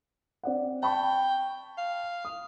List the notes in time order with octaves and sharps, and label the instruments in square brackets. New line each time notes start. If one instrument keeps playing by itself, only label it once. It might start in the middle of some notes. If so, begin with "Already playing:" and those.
[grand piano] C4 D5 F#5
[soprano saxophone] G5 [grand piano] A5 B5 C#6
[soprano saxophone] F5
[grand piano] D#6